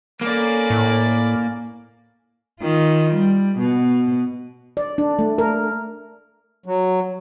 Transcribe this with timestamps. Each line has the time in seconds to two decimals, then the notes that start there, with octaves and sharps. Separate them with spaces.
0.21 A#3 C#4 A4 D5 B5
0.70 A2
2.60 D#3 F4
3.14 G3
3.59 B2
4.77 D5
4.98 D4
5.19 A3
5.38 A#4
6.66 F#3